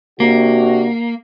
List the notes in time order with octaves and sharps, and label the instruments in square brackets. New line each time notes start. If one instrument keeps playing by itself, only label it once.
[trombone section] C3 D4 F#4 [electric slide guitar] A#3